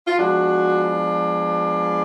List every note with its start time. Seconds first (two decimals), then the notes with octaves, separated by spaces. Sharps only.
0.07 F4
0.18 F3 G#3 B3 D4 F#4